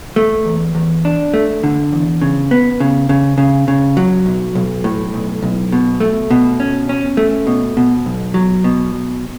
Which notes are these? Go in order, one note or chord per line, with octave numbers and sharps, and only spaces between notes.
A3
E2
E2
D4
A3
D3
E2
C#3
B3
C#3
C#3
C#3
C#3
F#3
B1
B1
A2
B1
B1
B2
A3
B2
C#4
C#4
A3
B2
B2
B1
F#3
B2